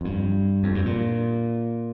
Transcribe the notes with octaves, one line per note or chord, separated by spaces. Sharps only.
F2
G2
F2
G2
A#2